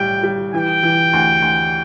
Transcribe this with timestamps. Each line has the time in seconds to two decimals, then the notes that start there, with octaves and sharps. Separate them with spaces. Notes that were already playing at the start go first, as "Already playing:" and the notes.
Already playing: B1 A2 G3 G5
0.23 G3
0.54 E3 G5
0.83 E3
1.13 D2
1.42 D2